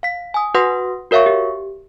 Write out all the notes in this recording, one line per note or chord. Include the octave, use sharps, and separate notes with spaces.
F5 B6
G#5 D#6
F#4 B4 F#5 C6 D#6 A#6
F#4 A#4 C#5 E5 F5 C#6
G4